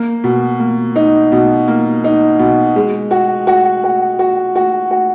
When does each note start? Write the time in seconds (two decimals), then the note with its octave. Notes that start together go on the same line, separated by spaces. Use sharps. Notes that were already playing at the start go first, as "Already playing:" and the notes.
Already playing: A#3
0.24 B2
0.60 A#3
0.96 D#4
1.32 B2
1.68 A#3
2.04 D#4
2.39 B2
2.76 G#3
3.11 F#4
3.47 F#4
3.84 F#4
4.19 F#4
4.56 F#4
4.91 F#4